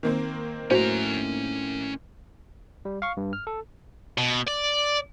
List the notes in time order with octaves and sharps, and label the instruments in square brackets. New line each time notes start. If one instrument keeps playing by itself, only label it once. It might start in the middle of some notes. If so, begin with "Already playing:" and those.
[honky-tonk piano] D#3 A#3 C4
[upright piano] A2 [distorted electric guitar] C#4 A#5 [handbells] F#4 C5
[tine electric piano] G3
F5 C#6
G2
F6
A4
[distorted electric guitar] B2
D5